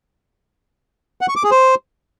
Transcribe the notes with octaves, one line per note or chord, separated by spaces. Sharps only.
F#5
C#6
D6
G#4
C5